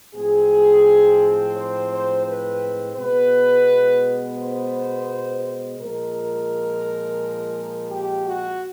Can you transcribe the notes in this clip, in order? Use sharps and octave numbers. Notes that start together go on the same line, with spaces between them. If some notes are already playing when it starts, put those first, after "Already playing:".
A2 F3 G#3 C4 G#4
C5
C5
B4
B2 G#3 B3 B4
C5
A#2 F3 G#3 A#4
G4
F#4